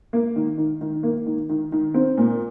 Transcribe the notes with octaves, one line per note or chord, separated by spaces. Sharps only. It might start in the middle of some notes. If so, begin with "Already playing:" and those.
A#3
D#3
D#3
D#3
A#3
D#3
D#3
D#3
C4
A#2